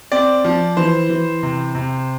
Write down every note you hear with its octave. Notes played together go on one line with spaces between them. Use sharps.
C4 D5
F3
E3 C5
E3
C3
C3